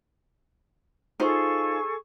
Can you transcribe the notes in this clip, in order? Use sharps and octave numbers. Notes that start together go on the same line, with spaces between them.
D#4 F4 G#4 A4 C5 C#6